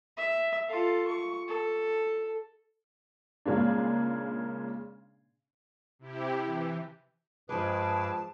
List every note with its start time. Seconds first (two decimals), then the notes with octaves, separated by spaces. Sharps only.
0.17 E5
0.68 F4 A4
1.08 C#6
1.48 A4
3.45 A#2 C#3 G#3 A#3 D4
5.99 C3 E4 G4
6.45 E3
7.49 G2 F3 G#3 G#4 B4 A5 D6